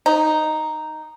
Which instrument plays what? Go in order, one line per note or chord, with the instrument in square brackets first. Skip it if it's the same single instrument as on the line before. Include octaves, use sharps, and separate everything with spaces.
[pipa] D#4